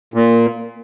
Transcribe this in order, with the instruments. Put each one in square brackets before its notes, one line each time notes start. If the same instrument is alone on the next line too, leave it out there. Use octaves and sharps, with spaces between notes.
[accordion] A#2